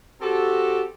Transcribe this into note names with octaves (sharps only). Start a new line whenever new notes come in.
C4 F#4 G4 A4